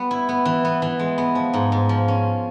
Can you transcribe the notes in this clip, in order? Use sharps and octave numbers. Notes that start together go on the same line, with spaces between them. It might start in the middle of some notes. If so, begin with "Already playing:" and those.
Already playing: G3 B3
E4
B3
E3
B3
E3
G#3
B3
F3
G#2
G#2
F3
C#4